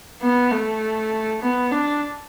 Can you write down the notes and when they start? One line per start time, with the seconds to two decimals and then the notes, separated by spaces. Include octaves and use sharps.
0.22 B3
0.51 A3
1.42 B3
1.71 D4